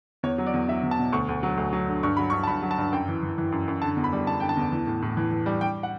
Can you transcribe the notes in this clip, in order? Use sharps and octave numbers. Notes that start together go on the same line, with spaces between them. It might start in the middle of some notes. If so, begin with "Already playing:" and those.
E2 C#5
F#3
D5
E2
F#3 E5
E2
A5
B2
D2 C#6
D2
F#3
D2
F#3
D3
G2 C#6
F#3 B5
C#6
G2
A5
G2 B5
F#3
A5
G2
F#2 G5
E3
E3
E3
F#2
F#2
D3 A5
E2
B5
G3
E2 A5
D3 G5
A5
E2
E3
A2
A2
E3
E3
G3
G3 G5
F#5